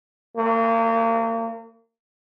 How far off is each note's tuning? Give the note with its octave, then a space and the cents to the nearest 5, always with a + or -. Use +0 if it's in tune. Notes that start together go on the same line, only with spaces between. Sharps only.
A#3 -35